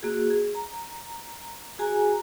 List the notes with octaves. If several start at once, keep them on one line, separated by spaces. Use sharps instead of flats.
A#3 F#4 G#4
G#4
A#5
F#4 G#4 G#5 A#5